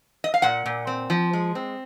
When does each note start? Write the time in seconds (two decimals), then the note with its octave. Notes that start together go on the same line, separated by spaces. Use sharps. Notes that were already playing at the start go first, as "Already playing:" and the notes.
0.24 D#5
0.34 F5
0.42 A#2 F#5
0.66 A#2
0.87 C4
1.10 F3
1.33 G#3
1.55 C4